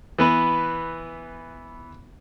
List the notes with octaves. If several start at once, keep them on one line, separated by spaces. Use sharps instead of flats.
E3 B3 B4